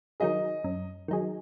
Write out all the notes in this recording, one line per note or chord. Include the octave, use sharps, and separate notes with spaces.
D#3 F#3 D#4 G#4 D#5
F#2
D#3 F#3 D#4 G#4